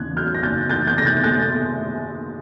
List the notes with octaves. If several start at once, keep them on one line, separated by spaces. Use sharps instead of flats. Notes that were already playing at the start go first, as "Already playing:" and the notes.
Already playing: E2 C#3 F#6 G#6
F#3 F6 G6
A#6
F#1 G6 A6
E3 G6 A6
G6 A6
C3 A#6
G6 A6
A3 G6 A6